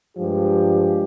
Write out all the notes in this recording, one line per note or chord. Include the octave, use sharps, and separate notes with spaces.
G2 F3 G#3 G4